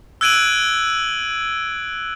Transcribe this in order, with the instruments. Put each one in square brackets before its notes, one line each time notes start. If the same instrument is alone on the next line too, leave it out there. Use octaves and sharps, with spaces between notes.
[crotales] E6 F#6 G#6 D7 D#7 F#7